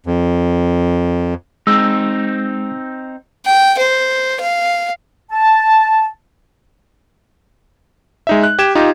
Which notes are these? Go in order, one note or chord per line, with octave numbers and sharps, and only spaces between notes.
F2
G#3 C4 D#4 E6
G5
C5
F5
A5
G#3 D#4 E5
F#6
G4 G#6 E7
D#4 F4 G4